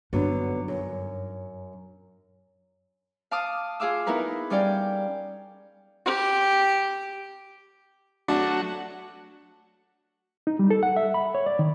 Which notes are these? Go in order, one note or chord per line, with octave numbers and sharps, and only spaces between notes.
G2 D3 F#3 B3 D#4
F#2
F5 A5 D6 D#6 F6
F4 G#4 F5 D6 E6
B3 D#4 E4 A#4 B4
G3 C#4 D5 F5 G5
G4
F#3 A3 D4 F#4
D#4
G3
A4
F#5
E5
B5
C#5
D5
D#3